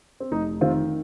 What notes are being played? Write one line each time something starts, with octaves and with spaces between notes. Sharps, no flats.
C4
F1 D#4
D#3 C4 F4